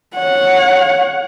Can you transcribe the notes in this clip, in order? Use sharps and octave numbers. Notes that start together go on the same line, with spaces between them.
C#5 F#5